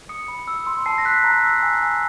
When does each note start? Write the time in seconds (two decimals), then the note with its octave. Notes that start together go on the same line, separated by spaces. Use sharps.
0.09 D#6 C#7
0.28 B5
0.48 E6
0.67 C6
0.86 A5 C7
0.98 A#6
1.05 F#6 B6
1.24 A#5
1.44 E6
1.63 G#5
1.82 G#5